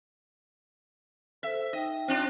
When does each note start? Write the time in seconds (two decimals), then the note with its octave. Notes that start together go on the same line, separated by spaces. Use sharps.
1.43 A4 C5 E5
1.73 D#4 D#5 E5 G5
2.08 C4 D4 F4